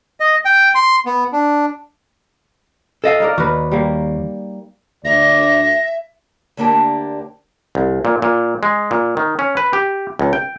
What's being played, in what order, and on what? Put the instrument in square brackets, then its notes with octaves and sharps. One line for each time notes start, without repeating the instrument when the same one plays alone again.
[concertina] D#5
G5
C6
B3
D4
[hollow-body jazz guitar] A4 D#5 F5
[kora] D#4 A#4 D5
[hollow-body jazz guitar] D#2 [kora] F#4 B4
[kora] G3 A#3
[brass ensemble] D2 [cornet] D5 [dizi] E5 [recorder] A#6
[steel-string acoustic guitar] D2 D3 A#3 D4 G4 A5
[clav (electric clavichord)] C2
A#2
A#2
G#3
A#2
D#3
C#4
B4
G4
C#2
G5